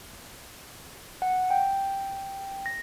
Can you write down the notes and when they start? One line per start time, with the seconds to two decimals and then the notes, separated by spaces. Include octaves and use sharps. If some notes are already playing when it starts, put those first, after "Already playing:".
1.22 F#5
1.50 G5
2.66 A#6